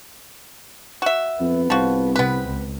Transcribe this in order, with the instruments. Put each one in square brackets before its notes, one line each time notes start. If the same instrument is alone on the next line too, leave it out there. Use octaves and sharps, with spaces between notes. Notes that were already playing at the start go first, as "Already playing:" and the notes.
[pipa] F#4 E5
[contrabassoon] F2 [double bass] B3
[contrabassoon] C2 [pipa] F3 F#4
[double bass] C3 C4 [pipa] B3 B4
[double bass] C#2